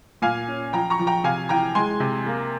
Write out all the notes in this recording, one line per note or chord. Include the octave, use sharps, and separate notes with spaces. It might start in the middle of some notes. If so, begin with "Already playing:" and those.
A#2 F5 G#5
C#4
F3 G5 A#5
A#5 C#6
F3
G5 A#5
C3 F5 G#5
E3 G5 A#5
G#3 G#5 C6
C3
A#3